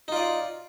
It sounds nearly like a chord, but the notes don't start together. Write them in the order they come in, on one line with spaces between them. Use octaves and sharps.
D#4 F4 D5